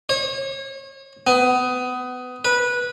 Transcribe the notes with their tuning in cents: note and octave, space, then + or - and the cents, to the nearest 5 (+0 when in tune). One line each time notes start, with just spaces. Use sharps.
C#5 -35
B3 +25
B4 -15